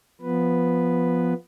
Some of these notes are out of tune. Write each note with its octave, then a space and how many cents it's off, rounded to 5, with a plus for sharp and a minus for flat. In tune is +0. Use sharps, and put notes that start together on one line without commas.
F3 +0 B3 +0 B4 +0